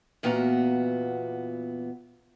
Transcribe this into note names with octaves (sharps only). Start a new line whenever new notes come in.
E2 A#2 B3 F#4 G#5 A#5